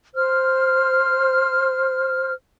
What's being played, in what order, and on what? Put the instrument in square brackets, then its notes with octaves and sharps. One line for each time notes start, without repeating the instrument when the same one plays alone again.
[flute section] C5 F6